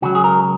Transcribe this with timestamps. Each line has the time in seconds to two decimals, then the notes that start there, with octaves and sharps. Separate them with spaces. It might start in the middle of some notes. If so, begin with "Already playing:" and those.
0.02 C#2 C#3 F#3 F#4
0.15 G#4
0.24 A#4